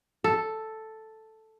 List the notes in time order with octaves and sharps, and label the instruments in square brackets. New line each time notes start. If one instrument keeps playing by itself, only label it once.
[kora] A4